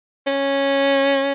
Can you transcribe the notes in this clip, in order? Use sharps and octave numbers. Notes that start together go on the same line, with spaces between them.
C#4